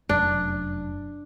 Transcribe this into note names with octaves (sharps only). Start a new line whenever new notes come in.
F1 F#2 D4